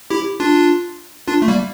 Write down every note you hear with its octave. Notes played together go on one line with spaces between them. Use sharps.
E4 G4
D4 F4
D4 F4
A3
G3 A#3